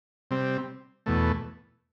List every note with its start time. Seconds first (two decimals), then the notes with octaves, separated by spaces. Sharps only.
0.31 C3 G3 C4
1.06 E2 B2 A3